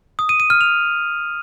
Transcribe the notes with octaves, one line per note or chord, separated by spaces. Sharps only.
D#6
D#7
D#7
F6
F7